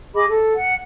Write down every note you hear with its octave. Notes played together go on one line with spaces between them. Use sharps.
G#4 D#5 B5 D6
A4
F#5